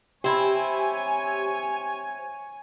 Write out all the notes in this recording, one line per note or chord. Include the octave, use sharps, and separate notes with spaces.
C4 E4 G4 C#5 G#5